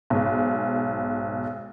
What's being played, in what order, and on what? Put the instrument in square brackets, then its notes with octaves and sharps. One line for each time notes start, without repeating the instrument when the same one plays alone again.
[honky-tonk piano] B1 G#2